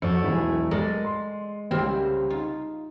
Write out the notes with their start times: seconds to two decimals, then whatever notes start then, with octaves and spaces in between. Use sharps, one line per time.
0.02 F2 A3 F#4 D5 C#7
0.24 E1 B1 E4 G#4
0.71 G#3 A4 A#4 D5
1.04 C6
1.71 C2 C#3 G3 A#3 C4 C5
2.30 D#4 F4